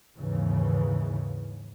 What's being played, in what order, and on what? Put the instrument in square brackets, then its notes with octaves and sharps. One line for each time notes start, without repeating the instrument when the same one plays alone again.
[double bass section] D#2 G#2 C#3 E3